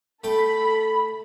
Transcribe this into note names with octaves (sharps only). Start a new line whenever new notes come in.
A3 A4 G5 B5